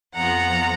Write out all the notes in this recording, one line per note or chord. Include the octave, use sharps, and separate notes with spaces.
F2 F3 B3 F4 F#5 A#5